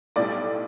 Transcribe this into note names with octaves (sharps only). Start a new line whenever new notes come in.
B1 A2 G3 D5